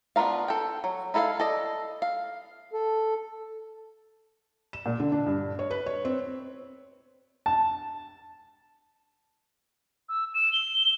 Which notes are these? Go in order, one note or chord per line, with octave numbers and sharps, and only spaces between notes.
B3 D4 F4 A#4 F5
A4 G5
F#3
D#4 E4 A4 B4 F5
A4 D5 D#5
F5
A4
E7
A#2
D3
D4
G2
C#5
B4
C#5
C4
A5
E6
E7
G7